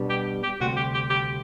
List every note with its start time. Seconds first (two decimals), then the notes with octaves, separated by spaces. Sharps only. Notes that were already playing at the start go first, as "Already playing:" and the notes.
Already playing: B2 G3 B3 D4
0.10 G4
0.43 G4
0.60 D2 C3 G3 C4 F#4
0.77 G4
0.94 G4
1.10 G4